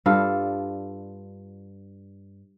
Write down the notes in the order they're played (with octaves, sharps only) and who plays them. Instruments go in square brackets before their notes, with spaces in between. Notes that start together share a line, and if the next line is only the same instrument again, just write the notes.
[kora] G2 D4 F4 A4